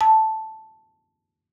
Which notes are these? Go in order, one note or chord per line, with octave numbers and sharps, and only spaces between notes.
A5